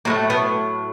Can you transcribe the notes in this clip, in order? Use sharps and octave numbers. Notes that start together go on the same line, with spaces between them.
A2 F#3 A3 A#3
B3